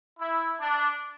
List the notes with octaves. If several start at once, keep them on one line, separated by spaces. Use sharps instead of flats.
E4
D4